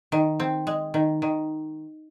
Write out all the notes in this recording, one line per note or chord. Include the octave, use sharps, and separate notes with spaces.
D#3
C4
G#3
D#3
D#3